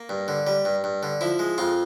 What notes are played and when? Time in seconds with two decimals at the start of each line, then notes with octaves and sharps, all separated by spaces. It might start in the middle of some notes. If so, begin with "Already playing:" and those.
Already playing: A#3
0.09 G2
0.28 D3
0.47 G3
0.65 G2
0.84 G2
1.03 D3
1.21 F3 E4
1.39 G#3
1.58 F2 F4